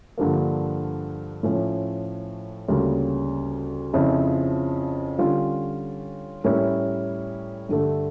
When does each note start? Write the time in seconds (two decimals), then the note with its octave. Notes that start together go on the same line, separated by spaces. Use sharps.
0.18 G2 D3 F3 A#3
1.43 A2 F3 C#4
2.68 D2 C#3 G3 A#3
3.93 F2 C#3 F3 C#4 E4
5.19 D3 G3 C#4 F4 C#5
6.44 A2 G3 C#4 E4 A#4
7.69 G2 D3 A3